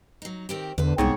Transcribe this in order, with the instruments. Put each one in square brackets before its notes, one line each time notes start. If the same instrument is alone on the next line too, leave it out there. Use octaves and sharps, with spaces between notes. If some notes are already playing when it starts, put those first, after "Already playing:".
[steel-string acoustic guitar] F#3 D#4
D#3 C4 G4
[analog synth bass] E2 [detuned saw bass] D3 [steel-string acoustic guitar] B4 C5
[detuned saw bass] C2 [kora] G#2 C#5 [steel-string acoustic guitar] C3 F#4 G#4 [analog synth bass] B3